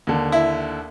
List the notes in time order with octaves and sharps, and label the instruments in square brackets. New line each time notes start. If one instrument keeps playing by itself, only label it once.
[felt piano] D#2 D3
[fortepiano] E4